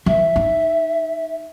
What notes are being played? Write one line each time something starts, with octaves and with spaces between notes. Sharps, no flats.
E3 E5
D#4